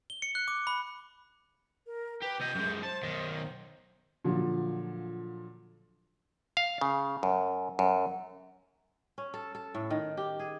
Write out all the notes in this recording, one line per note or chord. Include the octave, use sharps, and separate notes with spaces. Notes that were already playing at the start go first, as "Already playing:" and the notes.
G7
C#7
F#6
D6
B5
A#4
G4 B4
C3 D#5 G6
F#2 G#3
C5 A5
B1 D#3
A#2 D3 F3 F#3
F5
C#3
F#2
F#2
C#4
A4
A4
A2
D#3
G4
G#4